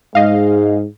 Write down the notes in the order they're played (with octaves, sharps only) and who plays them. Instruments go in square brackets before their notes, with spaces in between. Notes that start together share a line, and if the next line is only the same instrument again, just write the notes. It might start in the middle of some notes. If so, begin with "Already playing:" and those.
[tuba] G#2 [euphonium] G#3 [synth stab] D#5 F5